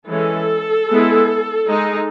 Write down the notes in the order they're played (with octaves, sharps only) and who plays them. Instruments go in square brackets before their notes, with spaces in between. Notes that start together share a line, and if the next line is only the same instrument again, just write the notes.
[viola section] E3 G#3 C#4 A4
G#3 B3 E4
G#3 D#4